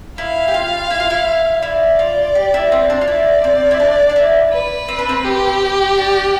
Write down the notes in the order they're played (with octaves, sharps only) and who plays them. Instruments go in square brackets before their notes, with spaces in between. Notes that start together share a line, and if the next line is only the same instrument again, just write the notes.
[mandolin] E4 [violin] F5
[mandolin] G4
F4
E4
F4
E4
[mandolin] E4 [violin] D5
[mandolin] F4
G4
E4
C4
D4
F4
[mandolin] E4 [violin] D5
[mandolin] C4
E4
D4
D4
E4
[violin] B4
[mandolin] C4
D4
C4
[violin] G4
[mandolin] D4